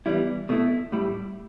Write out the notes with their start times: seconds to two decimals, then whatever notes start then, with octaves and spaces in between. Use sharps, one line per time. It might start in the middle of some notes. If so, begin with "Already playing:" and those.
0.06 E2 E3 G3 E4
0.49 B2 A3 E4
0.92 A2 G3 E4